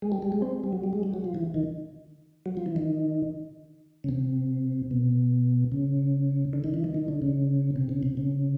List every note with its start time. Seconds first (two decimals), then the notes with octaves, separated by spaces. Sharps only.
0.02 G#3
0.12 G3
0.22 G3
0.32 G#3
0.42 C4
0.64 G3
0.73 F#3
0.83 G3
0.93 G#3
1.03 G3
1.14 F#3
1.24 F3
1.35 E3
1.54 D#3
2.46 F#3
2.57 F3
2.66 E3
2.76 D#3
4.04 C#3
4.09 C3
4.91 B2
5.72 C#3
6.53 D3
6.64 D#3
6.74 E3
6.84 D#3
6.94 D#3
7.08 D3
7.22 C#3
7.76 C3
7.89 C#3
8.03 C3
8.17 C#3